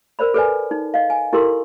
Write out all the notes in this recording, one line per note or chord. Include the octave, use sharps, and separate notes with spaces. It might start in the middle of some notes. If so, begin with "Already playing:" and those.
A#4 C5 D5 B5
A4 B4 D5 G#5
D#4
D#5 F5
G#5
E4 G4 A4 A#4 C6